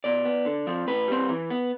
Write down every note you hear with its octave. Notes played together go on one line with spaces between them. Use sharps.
B2 D5
B3
D3
F3 C4
A2 B4
G3 C4
E3
B3